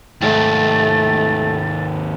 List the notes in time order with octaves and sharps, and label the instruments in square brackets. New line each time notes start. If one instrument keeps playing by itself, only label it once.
[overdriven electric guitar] D#2 G#2 [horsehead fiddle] A3 [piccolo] A6